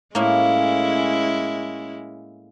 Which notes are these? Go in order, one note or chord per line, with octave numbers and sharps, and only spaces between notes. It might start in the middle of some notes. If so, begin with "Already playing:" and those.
A2 G#3 A#3 C#4 E4